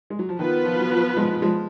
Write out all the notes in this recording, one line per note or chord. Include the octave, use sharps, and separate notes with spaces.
G#3
F#3
F3
D#3 B3 F4 B4
F3
F#3
F3
F3 G#3
F3 G#3